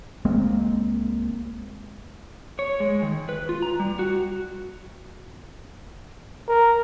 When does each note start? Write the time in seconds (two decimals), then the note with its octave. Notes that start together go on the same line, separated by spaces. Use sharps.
0.25 C#2 G#3 A#3 C4
2.59 C#5
2.80 G#3
3.02 D#3
3.29 B4
3.49 F4
3.62 A#5
3.80 G3
3.99 F#4
6.48 A#4